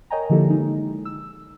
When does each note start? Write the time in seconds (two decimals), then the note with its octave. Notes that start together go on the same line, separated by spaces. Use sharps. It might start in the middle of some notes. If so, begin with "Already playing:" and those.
0.10 A#4 C#5 D#5 G5 G#5 A#5
0.30 D3 F3 A#3 E4 G4 A4
0.50 G#3 D#4
1.05 E6